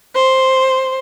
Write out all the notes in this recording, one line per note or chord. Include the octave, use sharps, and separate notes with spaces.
C5